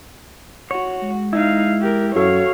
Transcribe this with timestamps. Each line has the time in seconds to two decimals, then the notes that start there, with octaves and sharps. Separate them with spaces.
0.71 F#4 C#5
1.03 G#3
1.33 D#4 E4 F5
1.81 G4 A#4
2.16 F#2 F#4 A4 C#5 F5